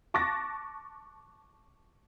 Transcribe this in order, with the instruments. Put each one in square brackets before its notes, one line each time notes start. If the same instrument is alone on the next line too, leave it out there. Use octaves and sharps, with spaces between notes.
[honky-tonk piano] A5 C#6 D6 F#6 A6 A#6